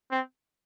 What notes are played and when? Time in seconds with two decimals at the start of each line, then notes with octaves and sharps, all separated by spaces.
0.11 C4